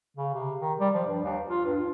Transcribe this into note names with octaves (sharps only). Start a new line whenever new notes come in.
C#3
C3
D#3
G3
F3
G2
D#2
F4
G2
F4